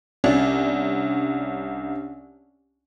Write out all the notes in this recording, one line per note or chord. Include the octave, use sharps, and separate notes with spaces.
C2 C#4 D4